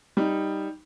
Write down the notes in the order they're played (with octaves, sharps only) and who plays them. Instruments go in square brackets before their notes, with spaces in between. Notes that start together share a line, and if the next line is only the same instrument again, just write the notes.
[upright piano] G3 D#4